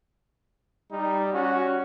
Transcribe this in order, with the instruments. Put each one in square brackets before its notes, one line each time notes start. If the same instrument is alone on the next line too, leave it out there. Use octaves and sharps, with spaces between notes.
[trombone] G3 [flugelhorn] D#4
[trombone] C#4 [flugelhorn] F#4